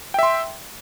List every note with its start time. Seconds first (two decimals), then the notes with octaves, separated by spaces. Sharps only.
0.14 G5
0.19 E5
0.23 C6